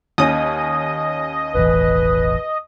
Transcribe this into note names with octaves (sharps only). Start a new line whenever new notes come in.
D#2 C#4 D#5 D#6
E1 A1 E3 B4